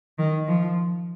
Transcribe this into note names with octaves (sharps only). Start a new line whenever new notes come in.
D#3
F3